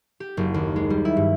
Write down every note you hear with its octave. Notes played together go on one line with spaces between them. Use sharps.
G4
F#1
D#2
G#3
G3
E4
G2